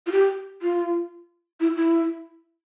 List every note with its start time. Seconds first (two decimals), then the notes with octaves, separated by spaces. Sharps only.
0.06 F4
0.11 G4
0.62 F4
1.60 E4
1.76 E4